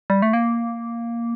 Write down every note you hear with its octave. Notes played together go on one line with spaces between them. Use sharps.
G3
A3
A#3